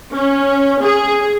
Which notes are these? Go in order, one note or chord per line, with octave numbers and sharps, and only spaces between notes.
C#4
G#4